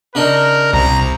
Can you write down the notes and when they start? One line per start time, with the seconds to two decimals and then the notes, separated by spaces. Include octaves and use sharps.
0.15 C#3 D4 D#4 A#4
0.73 C2 A#5